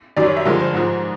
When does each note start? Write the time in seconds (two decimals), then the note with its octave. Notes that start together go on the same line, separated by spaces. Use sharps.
0.17 F#2 D#3 G3 D5
0.26 C#5
0.37 E5
0.46 G2 D3 F3 G#3 A#4
0.60 C5
0.74 G#2 F3 G#3